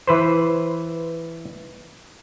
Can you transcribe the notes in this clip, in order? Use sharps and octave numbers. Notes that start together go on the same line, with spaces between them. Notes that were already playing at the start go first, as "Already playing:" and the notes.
E3 B4 C5